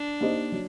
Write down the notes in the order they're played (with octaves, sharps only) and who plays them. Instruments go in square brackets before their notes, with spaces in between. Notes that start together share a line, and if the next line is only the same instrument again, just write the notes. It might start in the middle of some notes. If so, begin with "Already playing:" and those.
Already playing: [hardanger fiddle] D4
[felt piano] A#3 D#4 G4 C5 D#5
F#3